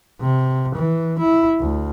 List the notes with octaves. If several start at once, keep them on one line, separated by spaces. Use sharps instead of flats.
C3
E3
E4
D2